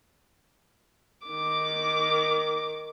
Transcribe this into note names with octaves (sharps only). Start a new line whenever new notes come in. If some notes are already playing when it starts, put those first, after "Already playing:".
D#3 D6